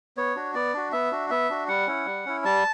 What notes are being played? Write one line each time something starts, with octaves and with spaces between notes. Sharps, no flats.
B3 C#5
D4 F#4
B3 D5
D4 F#4
B3 E5
D4 F#4
B3 E5
D4 F#4
G3 F#5
C#4 E4
G3
C#4 E4
G3 A5